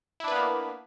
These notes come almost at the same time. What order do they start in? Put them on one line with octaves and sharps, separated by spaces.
E4 D4 B4 B3 A#3